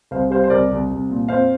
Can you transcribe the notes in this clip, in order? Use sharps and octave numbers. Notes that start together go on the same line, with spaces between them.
C2 C5 F5
G3 C5 F5
C5
C2 A#4 D5
C2
C2
A#2
F2 C5 F5